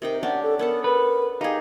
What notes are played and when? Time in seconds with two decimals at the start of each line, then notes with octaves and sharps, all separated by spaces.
0.02 C3 D#4 A#4 G5
0.23 C#4 D4 G4 F#5
0.43 A4
0.59 B3 A4 A#4 F#5
0.84 A#4 B4
1.41 D#4 G4 G#4 F5